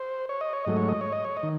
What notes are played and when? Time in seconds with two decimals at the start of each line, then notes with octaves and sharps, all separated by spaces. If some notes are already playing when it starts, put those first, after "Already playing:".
Already playing: C5
0.29 C#5
0.41 D#5
0.53 C#5
0.65 G#2 F#3 A3 D#5
0.77 C#5
0.88 D#5
1.01 C#5
1.12 D#5
1.25 C#5
1.37 D#5
1.43 D#3